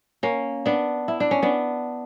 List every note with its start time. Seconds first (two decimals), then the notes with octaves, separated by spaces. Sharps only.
0.23 A#3 C#4
0.66 B3 D4
1.08 E4
1.20 D4
1.31 C#4
1.42 B3 D4